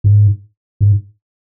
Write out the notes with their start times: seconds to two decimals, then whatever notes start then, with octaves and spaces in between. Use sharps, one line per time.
0.04 G#2
0.81 G#2